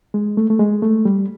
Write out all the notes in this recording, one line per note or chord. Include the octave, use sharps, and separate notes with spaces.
G#3
A3
A3
G#3
A3
G3